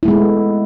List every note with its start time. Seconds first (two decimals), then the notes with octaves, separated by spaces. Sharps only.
0.03 E4
0.05 A3
0.08 G#3
0.11 B3